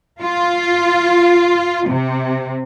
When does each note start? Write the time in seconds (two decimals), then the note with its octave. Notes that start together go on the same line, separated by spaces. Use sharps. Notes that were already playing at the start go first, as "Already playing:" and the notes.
0.21 F4
1.88 C3